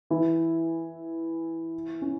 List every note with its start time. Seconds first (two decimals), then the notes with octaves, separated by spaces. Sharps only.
0.10 E3 E4
2.02 C#4